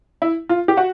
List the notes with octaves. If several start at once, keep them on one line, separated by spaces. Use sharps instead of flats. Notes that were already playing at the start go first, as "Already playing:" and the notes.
E4
F4
G4
F#4